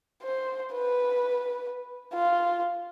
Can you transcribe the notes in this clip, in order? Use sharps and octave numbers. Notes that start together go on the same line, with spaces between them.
C5
B4
F4